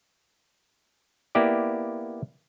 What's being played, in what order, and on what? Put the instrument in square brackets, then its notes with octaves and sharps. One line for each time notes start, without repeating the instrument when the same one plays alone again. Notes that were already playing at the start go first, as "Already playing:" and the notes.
[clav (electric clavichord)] A#3 B3 E4 G4 D5